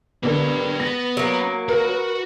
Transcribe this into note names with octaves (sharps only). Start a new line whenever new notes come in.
B2 D3 A#3 G4 B4
B3 A#6
F#3 A#3
F#4 A#4 B4 F#5